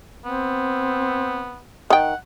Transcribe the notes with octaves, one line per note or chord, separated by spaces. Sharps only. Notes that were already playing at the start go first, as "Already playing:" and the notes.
B3 C4
D#3 F#5 G5